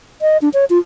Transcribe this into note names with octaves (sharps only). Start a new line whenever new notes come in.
D#5
D4
C#5
F4